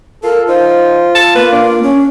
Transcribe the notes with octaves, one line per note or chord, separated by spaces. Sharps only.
F4 A4 A#4
D#4 F4 C5
A5
A#3 B4
D4
C#4